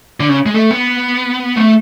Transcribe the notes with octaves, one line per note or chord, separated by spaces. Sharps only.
D3
C#3
G#3
A3
B3
A3